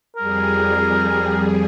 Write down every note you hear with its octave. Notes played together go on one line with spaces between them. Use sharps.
F2 G3 G#4 A#4